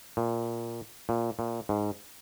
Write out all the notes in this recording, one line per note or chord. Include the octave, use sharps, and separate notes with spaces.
A#2
A#2
A#2
G#2